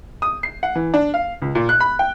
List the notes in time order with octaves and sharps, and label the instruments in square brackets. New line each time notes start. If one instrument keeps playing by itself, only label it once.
[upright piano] D#6
C7
F#5
E3
D4
F5
C#2
A#2
F#6
B5
G5